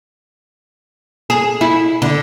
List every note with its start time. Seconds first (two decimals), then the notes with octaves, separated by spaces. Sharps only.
1.30 G#4
1.61 E4
2.02 D3